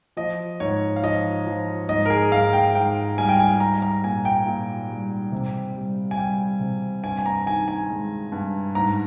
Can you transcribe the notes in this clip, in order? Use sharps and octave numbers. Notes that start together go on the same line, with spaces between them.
F3 D#5
G#2 C#5
F5
F3 D#5
F3
G#2 D#5
A#4
G#4
G#2 F5
G5
G#2 G5
G3 G#5
G5
G#5
G3 A#5
A#5
A#2 G#5
G5
A#2
G3
C3
G3
G#5
G3 G5
C3
G2 G#5
G#5
A#5
D#3 G#5
G#5
G#3
G2
G#2 A#5